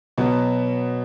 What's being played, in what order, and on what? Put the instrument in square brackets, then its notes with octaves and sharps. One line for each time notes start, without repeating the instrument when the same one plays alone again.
[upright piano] B2 F#3 B3